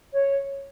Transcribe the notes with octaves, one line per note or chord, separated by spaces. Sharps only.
C#5